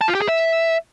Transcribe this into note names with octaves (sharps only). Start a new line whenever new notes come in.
A5
F4
G4
G#4
E5